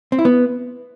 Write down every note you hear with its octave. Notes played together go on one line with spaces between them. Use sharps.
C4
E4
B3